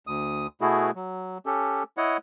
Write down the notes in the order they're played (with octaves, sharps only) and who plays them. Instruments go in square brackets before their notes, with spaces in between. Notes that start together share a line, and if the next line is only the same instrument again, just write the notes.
[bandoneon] D2 D#6
B2 A3 B3 E4 F#4 G#4
F#3
C#4 G4 A4
E4 C#5 D#5 F#5